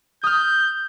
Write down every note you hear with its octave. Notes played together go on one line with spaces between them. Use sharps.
D#6 F6 G6